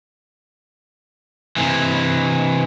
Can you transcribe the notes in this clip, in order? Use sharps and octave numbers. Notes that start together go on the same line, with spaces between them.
C3 E3